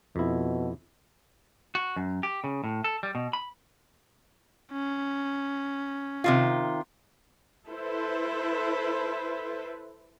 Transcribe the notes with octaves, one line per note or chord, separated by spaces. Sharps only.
F2 B2 E4
F#4
F#2
G4
C#3
A2
A4
G3
B2
B5
C#4
C3 D#3 F4
E4 A4 B4 C5